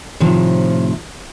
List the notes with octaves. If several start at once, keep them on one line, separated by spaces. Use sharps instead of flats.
A2 C3 D#3 F3